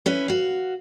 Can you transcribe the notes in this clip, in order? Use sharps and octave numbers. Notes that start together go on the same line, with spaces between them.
C#4 E4 B4
F#4 F5